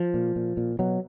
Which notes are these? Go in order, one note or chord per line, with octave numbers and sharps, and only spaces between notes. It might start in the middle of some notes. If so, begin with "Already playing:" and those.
Already playing: F3
A#2
A#2
A#2
B2 F#3